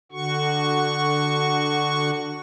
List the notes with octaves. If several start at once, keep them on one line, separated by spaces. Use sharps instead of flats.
D3 F#4 C#6